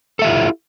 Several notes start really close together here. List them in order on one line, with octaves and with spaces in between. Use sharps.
A4 E5 G4 F4 E4